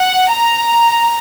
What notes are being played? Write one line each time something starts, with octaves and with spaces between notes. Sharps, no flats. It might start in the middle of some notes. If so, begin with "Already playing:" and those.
Already playing: F#5
A#5